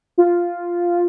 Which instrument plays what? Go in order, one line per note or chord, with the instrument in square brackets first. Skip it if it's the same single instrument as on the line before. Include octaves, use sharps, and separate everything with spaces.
[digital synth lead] F4